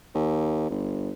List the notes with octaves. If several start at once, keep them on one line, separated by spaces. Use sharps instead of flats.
D#2
G1